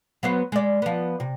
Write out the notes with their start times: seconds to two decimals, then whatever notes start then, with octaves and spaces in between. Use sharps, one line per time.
0.23 F#3 B3 C5
0.52 G#3 D5
0.82 F3 B3
1.20 C3